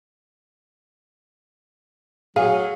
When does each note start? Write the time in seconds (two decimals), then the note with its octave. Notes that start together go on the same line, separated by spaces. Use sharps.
2.36 F#3 G#4 F5